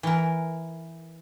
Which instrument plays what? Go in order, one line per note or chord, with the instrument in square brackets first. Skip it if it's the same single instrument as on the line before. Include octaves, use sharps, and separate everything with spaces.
[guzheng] E3 A#4